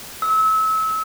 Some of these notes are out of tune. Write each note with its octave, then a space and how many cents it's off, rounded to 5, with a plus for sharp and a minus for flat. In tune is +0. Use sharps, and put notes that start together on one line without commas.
E6 -30